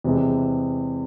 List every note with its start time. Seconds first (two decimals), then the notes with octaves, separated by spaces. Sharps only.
0.04 E2 C3 E3 G#3